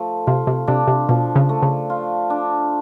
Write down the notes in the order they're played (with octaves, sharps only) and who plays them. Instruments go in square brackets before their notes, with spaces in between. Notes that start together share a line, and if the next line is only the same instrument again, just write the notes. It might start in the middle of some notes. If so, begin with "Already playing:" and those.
Already playing: [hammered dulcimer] F3 A3
[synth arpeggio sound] C3 [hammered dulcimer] F4
[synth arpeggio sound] C3
[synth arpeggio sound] C3 [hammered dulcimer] D4
[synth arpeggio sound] C3
[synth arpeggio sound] B2 [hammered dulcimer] F3
[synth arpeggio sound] C#3
[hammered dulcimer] A3
[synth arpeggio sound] C#3
[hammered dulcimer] F4
D4